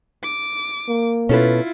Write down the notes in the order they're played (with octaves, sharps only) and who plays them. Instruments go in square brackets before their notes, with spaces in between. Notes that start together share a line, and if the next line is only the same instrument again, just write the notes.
[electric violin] D6
[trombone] A#3
[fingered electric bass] B2 [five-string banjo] C#4 A4 B4 [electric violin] E4 F4